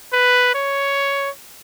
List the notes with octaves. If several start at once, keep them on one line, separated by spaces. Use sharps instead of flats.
B4
C#5